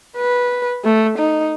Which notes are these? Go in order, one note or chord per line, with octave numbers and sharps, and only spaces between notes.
B4
A3
D#4